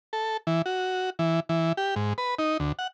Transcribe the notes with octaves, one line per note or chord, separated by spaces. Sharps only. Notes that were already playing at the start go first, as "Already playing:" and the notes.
A4
E3
F#4
E3
E3
G4
G#2
B4
D#4
D2
F#5